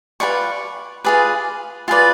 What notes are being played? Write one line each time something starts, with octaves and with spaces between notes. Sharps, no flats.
F4 G#4 B4 D5 C#6
F4 G#4 B4 D5
F4 G#4 B4 D5